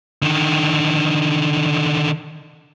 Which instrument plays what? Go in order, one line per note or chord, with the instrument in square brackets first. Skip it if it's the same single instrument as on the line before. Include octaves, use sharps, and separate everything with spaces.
[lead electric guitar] D3 D#3